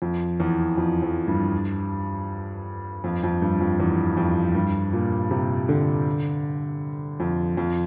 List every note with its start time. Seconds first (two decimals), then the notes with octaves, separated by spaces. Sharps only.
0.02 F2
0.40 E2
0.77 F2
1.02 F2
1.28 G2
3.04 F2
3.23 F2
3.42 G2
3.60 F2
3.80 E2
4.17 F2
4.55 G2
4.93 A#2
5.31 C3
5.69 D3
7.20 F2
7.57 F2